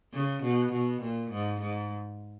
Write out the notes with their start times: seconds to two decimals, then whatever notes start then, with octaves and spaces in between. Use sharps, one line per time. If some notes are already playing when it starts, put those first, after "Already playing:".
0.13 C#3
0.43 B2
0.72 B2
1.01 A#2
1.31 G#2
1.61 G#2